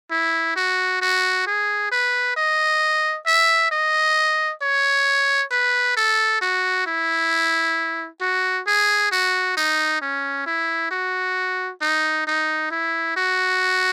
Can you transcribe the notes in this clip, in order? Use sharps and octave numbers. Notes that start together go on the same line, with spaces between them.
E4
F#4
F#4
G#4
B4
D#5
E5
D#5
C#5
B4
A4
F#4
E4
F#4
G#4
F#4
D#4
C#4
E4
F#4
D#4
D#4
E4
F#4